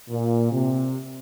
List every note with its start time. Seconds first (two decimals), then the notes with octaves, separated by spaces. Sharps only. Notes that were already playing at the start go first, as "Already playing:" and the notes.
0.09 A#2
0.52 C3